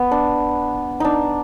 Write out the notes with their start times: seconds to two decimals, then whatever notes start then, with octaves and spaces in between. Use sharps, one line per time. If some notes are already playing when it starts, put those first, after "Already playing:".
Already playing: B3
0.11 D4
1.00 D4 D#4